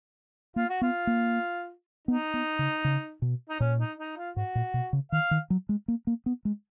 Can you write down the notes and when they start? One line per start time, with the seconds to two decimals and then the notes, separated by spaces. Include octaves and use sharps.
0.56 A#3 F4
0.69 F#4
0.81 B3 F4
1.07 A#3
2.08 B3 D#4
2.34 B3
2.59 C#3
2.84 C#3
3.22 B2
3.49 D#4
3.60 A#2 C#4
3.79 D#4
3.99 D#4
4.17 F4
4.36 G#2 F#4
4.55 A#2
4.74 B2
4.93 C#3
5.12 D#3 F5
5.31 D#3
5.50 F#3
5.69 G#3
5.88 A#3
6.07 A#3
6.26 B3
6.45 G#3